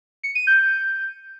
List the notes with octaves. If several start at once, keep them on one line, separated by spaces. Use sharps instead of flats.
C#7
D#7
G6